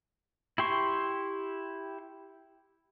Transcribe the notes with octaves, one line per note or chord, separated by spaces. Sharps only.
E4 G4 C6 C#6